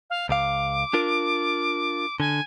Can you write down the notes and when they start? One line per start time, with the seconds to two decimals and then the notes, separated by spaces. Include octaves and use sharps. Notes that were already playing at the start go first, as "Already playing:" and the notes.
0.10 F5
0.29 C#2 F5 D6
0.93 D4 F4 A#4
2.20 D3 G#5